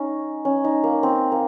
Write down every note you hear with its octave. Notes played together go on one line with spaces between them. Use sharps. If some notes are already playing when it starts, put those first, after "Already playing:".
Already playing: C#4 D#4
C#4
D#4
A#3
C4
A#3